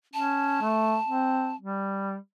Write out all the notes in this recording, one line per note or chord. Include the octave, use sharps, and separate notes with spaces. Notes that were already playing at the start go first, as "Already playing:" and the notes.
C#4 A5
A3
C4
G3